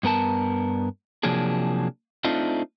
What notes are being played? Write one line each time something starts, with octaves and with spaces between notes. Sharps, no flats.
G2 B3 A#4 A5
C3 F3 F#3 A#3 D4 G#4
A3 C4 D4 D#4 F4